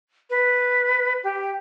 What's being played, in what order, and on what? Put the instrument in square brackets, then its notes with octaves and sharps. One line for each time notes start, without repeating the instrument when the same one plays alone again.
[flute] B4
G4